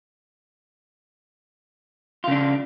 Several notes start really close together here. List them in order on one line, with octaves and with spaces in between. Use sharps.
F4 C#3 D4